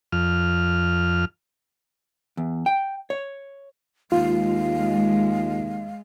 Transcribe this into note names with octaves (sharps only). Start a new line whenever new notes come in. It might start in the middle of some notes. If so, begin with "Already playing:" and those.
F2 F6
E2
G5
C#5
D#2 G#3 F4 F5